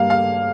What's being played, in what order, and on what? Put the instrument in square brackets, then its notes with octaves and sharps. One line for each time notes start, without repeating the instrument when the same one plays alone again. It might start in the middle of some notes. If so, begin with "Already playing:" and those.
Already playing: [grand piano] G2 G3 A#3 F5
F5